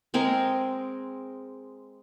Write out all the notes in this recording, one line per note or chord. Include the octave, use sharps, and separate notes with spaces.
G#3 C4 G#4 A#4